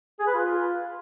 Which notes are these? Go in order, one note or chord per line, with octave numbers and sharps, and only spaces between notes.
G#4
B4
F4